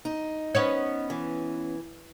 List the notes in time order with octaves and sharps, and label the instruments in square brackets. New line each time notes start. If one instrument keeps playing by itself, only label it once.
[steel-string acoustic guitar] D#4
[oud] B3 C#4 C#5
[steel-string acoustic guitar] E3